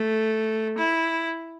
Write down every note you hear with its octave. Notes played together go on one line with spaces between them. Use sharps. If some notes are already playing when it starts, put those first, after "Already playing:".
Already playing: A3
E4